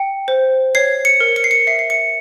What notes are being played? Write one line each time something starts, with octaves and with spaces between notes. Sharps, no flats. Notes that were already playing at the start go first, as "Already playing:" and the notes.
Already playing: G5 C#7
C5
C#5 C7
C#7
A#4
C#7
C7
C#7
E5 C7
C7
C#7